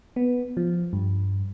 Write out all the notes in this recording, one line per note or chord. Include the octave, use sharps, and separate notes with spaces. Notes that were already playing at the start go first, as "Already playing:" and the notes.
B3
F3
G2